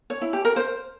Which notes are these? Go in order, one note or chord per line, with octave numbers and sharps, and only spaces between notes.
C#5
E4
G4
A#4
C5